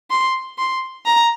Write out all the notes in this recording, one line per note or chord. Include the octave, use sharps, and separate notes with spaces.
C6
C6
A#5